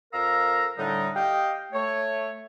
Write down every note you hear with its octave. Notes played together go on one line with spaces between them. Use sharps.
F2 A4 A#4 F5 A#5 E6
A2 D3 G3 D4 D#4
G4 D#5 F5 G5
A3 C#5